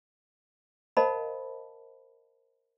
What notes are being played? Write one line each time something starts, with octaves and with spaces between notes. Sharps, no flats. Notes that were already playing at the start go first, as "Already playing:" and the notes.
A#4 C5 D#5 F5 A5 B5